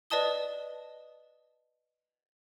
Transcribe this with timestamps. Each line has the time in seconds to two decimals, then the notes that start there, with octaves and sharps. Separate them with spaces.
0.10 B4 D5 D#5 A5 D#6 G7